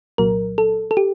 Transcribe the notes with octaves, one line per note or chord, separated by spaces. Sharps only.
C2 A#2 F#3 A#4
A4
A4
G4